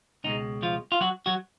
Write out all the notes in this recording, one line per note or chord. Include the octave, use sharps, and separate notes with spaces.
C#2 B2 G#3 D#4
F3 F4
F4
F#3 F#4
F#3 F#4